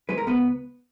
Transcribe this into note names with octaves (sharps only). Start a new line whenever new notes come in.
G#3 B4
A#4
C#2 B3 B4